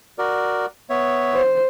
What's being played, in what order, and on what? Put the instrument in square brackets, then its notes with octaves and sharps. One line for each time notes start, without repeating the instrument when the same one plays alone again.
[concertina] F#4 A#4 D5
B3 C#5 E5
[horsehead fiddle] C5